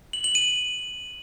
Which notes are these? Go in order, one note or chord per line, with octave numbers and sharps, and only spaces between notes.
F#7
F#7
D#7